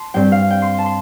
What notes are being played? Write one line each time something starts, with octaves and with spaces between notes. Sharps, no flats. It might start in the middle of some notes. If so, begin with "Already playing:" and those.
Already playing: A5 C6
G2 G3 C4 G5
F5
G5
C6
A5
C6